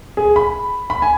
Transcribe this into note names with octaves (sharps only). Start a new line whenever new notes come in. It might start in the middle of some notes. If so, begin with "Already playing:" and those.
G#4
B5
B5
G#5